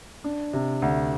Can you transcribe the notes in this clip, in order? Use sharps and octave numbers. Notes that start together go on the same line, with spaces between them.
D4
C3
D2